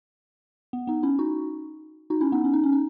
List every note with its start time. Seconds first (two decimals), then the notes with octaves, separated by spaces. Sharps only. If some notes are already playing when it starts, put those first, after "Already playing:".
0.73 B3
0.87 B3 D#4
1.03 C#4 E4
1.19 D#4 F#4
2.10 D#4 F#4
2.21 C#4 E4
2.32 B3 D#4
2.44 C#4
2.53 D#4
2.64 C#4
2.73 D#4